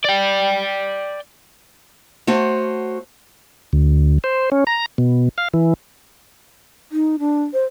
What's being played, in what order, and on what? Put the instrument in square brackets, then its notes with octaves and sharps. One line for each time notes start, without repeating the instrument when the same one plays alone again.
[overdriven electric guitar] D5 G5
[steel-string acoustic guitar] A3 F#4 C5 C#5
[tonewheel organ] D2
C5
C#4
A#5
B2
F5
E3
[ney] D#4
D4
C5